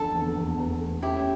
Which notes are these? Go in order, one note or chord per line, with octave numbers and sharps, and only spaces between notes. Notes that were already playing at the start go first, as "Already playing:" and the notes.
Already playing: E2 D3 F3 A4
E2
E2
E2
A3
C#4 E4 G4